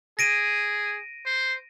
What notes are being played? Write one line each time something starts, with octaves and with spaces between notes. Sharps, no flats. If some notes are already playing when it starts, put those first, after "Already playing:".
G#4 A#6 D7 D#7
C5